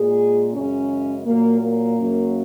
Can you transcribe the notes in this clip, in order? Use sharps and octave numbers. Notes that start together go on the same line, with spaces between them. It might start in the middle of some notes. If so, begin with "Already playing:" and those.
Already playing: A#2 G#3 G#4
F#2 C#3 G#3 C#4
A#2 F#3 A#3
A#3
F#2 C#3 F#3